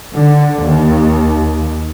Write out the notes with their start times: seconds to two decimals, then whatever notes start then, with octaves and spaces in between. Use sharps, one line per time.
0.13 D3
0.61 D#2